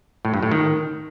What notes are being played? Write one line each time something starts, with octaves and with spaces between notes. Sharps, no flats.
A2
G2
A2
D#3